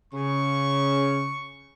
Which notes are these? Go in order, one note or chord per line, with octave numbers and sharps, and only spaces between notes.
C#3 C#6